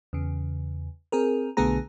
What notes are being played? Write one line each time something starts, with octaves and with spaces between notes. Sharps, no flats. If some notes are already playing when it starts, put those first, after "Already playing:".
E2 C#3
C4 G#4 A#4
B1 D3 A3 B3 G#4 A#5